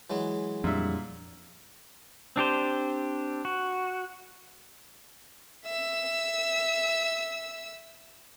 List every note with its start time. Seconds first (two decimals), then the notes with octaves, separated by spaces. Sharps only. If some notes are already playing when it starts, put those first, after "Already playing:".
0.10 E3 F#3 G#3
0.64 F2 A#2 G3 D4 E5
2.36 C4 D4 G4 C5
3.45 F#4
5.65 E5 E6